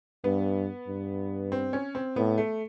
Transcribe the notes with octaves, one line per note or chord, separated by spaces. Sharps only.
G2 B3
G2
C4
C#4
C4
A2 B3
A3